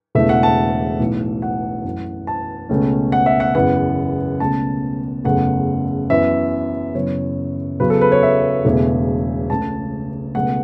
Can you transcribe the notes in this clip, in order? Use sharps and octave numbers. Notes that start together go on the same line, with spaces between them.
E1 E2 C#3 E3 A3 E5
F#5
A5
B1 A2 E3
F#5
F#2 E3 A3
A5
C#2 B2 A3 C#4
F#5
E5
F#5
F#1 E2 E3 B3 F#5
C#2 B2 A3 C#4 A5
F#1 E2 C#3 A3 F#5
F#2 E3 B3 E5
F#1 F#2 E3 B3 C#5
E2 C#3 F#3 B4
A4
B4
C#5
E5
E1 E2 C#3 A3
C#2 C#3 A3 A5
C#2 B2 A3 F#5